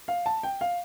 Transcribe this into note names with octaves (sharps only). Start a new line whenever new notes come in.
F5
A5
G5
F5